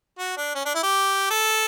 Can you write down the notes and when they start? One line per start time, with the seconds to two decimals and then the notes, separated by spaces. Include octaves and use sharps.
0.18 F#4
0.37 D4
0.55 C#4
0.66 D4
0.75 E4
0.83 G4
1.30 A4